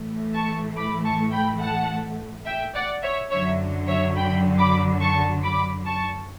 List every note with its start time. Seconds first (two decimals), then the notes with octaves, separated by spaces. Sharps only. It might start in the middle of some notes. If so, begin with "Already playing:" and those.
Already playing: A2 E3 A3
0.34 A5 C#6
0.76 B5 D6
1.05 A5 C#6
1.33 G5 B5
1.61 F#5 A5
2.46 E5 G5
2.74 D5 F#5
3.03 C#5 E5
3.31 F#2 D3 F#3 C#5 E5
3.87 C#5 E5
4.16 G5 B5
4.58 B5 D6
5.00 A5 C#6
5.43 B5 D6
5.85 A5 C#6